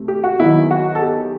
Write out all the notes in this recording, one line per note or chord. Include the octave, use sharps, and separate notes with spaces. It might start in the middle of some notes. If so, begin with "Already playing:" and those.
Already playing: C3 A3
G4
F#4
E2 D#3 F#3 E4
F#4
A4
G4